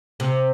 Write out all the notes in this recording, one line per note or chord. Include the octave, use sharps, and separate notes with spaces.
C3